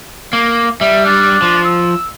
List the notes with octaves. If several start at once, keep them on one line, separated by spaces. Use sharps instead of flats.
A#3
G3 E5
D4
F3
E6